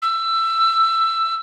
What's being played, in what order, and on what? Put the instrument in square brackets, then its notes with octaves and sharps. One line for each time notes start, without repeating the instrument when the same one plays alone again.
[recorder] E6